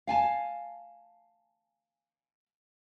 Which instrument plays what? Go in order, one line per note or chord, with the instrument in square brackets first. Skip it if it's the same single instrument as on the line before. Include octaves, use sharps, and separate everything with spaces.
[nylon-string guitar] F5 G#5 A5